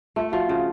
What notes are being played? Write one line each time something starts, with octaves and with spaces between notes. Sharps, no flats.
A3 F4
F3 F#4
C#3 F4